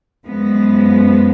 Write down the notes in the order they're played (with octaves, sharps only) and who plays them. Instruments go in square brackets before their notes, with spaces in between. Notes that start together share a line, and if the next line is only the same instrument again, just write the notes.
[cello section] F#2 F3 G#3 B3